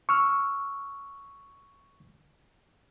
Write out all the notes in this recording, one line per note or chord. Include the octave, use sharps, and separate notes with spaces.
C#6 E6 F6